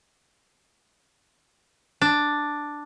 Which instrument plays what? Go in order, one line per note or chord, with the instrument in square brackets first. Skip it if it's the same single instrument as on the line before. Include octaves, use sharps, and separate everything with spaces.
[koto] D4